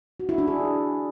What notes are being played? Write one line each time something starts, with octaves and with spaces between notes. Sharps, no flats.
F#4
E4
D4
G#4